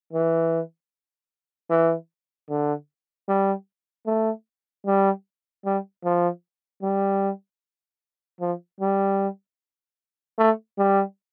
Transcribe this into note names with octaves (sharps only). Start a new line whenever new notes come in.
E3
E3
D3
G3
A3
G3
G3
F3
G3
F3
G3
A3
G3